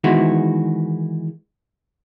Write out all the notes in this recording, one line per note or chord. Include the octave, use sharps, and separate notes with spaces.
D#3 E3 G#3 B3 F#4